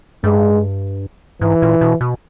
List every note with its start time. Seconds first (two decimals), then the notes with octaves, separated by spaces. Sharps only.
0.24 G2 G#3
1.41 G#2 E3
1.62 A#2
1.81 B2
2.01 B2